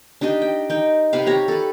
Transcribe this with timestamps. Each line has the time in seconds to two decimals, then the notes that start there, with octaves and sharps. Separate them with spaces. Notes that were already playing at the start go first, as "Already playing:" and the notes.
0.21 D4 D#4 G4 D#5
0.42 G5
0.70 D#4 G5
1.13 C3 G4 B4 F5
1.26 G4 C#5 A#5
1.48 A4 B4